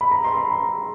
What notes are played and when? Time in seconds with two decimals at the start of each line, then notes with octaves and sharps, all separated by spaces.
0.01 B5
0.11 A#5
0.24 C6
0.38 B5
0.51 A#5